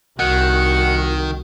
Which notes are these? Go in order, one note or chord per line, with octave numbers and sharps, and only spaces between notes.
C2 D#3 F#4 F#5